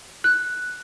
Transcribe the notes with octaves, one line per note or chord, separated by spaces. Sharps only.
F#6